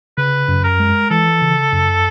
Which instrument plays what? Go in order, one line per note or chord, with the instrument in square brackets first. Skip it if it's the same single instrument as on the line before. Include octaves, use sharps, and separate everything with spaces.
[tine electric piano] C#3 [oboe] B4
[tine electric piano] F#2
[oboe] A#4
[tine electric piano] G#3
[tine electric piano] E3 [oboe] A4
[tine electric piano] C#3
F#2